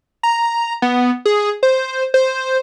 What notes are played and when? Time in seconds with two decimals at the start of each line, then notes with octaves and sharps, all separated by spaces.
0.23 A#5
0.82 B3
1.25 G#4
1.63 C5
2.14 C5